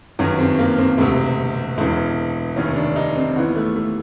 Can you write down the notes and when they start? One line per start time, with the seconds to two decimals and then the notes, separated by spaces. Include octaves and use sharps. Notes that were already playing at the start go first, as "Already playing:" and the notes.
0.19 G1 F#2 D#3 C#4
0.39 C4
0.59 A#3
0.79 C4
0.98 E1 D2 C3
1.78 E1 E2 C#3
2.56 F1 D#2 D#3 C#4
2.76 D4
2.96 D#4
3.16 C4
3.36 D#2 C#3 E3 B3
3.56 A3
3.76 A3